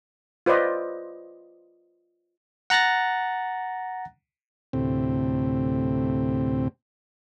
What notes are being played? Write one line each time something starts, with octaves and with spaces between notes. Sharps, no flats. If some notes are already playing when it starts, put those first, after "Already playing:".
F4 B4 C5 D5 D#5
F#5 A#5 F#6 A6 A#6
D2 A2 C3 C4